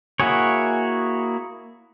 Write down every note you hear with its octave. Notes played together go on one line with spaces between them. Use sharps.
A#3 E4 F#4 G#4 C#5